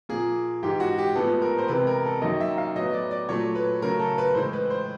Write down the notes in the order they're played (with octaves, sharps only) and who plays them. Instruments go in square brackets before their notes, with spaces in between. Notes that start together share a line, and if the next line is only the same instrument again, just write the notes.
[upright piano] A#2 F3 A#3 G#4
G#2 E3 G#3 G4
F#4
G4
A2 F3 G#3 B3 A4
A#4
C5
C3 E3 G#3 B3 B4
A#4
A4
F#2 D#3 F#3 A#3 D#5
E5
F5
A2 F#3 B3 D#5
D5
D5
A#2 F#3 A3 C#5
B4
C#3 F#3 A3 A#4
A4
B4
A2 E3 G#3 C5
B4
C5